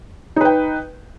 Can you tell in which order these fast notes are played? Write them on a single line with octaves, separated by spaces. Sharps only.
D#4 B4 G5